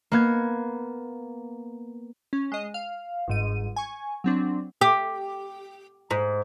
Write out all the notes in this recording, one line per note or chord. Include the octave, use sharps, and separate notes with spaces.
A#3 B3 G#6
C#4
G#3 D#5
F5
G1 G#2 D#7
G#5 C#6
F#3 C4 D4
G4
G#2